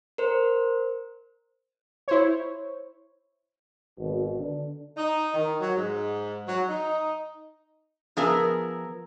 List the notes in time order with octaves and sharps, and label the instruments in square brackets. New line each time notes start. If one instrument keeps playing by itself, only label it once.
[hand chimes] A#4 C5
[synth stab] E4 C5 C#5
[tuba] G#1 [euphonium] B2
[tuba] D3 [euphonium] D4
[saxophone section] D#4
D#3
F#3
G#2
F#3
D#4
[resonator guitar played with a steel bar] F3 B3 G#4 A#4 E5 A#5